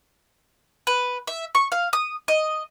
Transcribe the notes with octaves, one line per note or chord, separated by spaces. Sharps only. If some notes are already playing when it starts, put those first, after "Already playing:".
B4
E5
C#6
F5
D#6
D#5